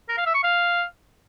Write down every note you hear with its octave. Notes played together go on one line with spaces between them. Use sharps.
A#4
F5
E5
C#6
F5